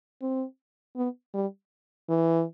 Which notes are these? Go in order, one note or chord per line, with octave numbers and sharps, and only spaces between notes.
C4
B3
G3
E3